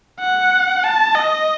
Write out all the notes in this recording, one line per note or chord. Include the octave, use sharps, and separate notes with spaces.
F#5
A5
D#5